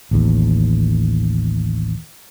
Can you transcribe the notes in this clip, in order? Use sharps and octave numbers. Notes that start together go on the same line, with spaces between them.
A1 D#2